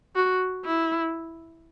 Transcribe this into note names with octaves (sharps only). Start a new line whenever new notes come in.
F#4
E4